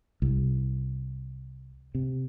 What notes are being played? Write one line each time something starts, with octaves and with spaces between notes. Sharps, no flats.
C2
C3